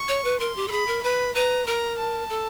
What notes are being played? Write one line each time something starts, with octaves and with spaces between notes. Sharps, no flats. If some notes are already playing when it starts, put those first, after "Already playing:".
Already playing: C#6
C#5
B4
A#4 C6
G4
A4
G#4 B5
A#4
B4 B5
B4 A#5
A#4 A#5
A5
A4